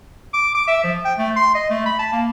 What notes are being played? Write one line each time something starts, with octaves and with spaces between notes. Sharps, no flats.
D6
D6
E5
F3
G5
A3
C6
D#5
A3
B5
A5
A#3